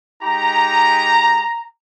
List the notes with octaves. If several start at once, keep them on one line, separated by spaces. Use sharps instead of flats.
G#3 D#4 G4 A#5